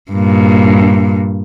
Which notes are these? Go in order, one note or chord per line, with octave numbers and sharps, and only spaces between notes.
G2 A#2